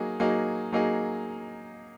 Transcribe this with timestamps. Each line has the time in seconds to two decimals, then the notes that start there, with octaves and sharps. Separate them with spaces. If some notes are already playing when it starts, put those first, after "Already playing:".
Already playing: F#3 A#3 D#4 G#4
0.20 F#3 A#3 D#4 G#4
0.72 F#3 A#3 D#4 G#4